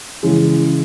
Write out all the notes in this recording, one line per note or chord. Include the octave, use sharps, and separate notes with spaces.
C#3 E3 G#3